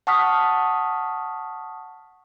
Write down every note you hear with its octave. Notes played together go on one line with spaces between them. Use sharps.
F#5 A5 C#6 D#6 F6 B6